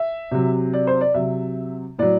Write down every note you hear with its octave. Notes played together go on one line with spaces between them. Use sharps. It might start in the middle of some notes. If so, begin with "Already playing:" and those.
Already playing: E5
C3 F#3
D5
C5
D5
C3 F#3 E5
A2 F#3 D5